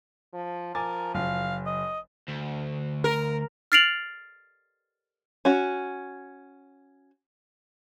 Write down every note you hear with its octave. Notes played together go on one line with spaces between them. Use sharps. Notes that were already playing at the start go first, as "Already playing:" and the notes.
F3
F3 A#4 G#5 D6 A6
F#1 F5
D#5
D2
A#4
F6 A6 C7 D7 F7 F#7
C#4 F#4